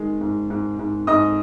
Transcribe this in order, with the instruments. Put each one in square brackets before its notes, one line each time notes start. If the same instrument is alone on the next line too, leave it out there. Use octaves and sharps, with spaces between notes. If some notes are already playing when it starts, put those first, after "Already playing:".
Already playing: [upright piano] D#3 G#3
G#2
G#2
G#2
G#2 D#5 D#6